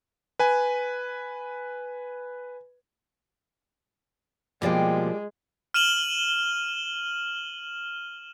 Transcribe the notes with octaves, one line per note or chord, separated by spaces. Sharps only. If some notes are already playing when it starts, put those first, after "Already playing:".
B4 G#5
B2 F3 G3 G#3 A#3 D5 G5
F6 D#7 E7 F#7 G7